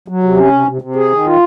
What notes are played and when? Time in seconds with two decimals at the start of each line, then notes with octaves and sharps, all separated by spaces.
0.08 F#3
0.23 C3
0.37 C#4
0.53 C3
0.67 C3
0.82 C3
0.96 G#4
1.11 D#3
1.26 F4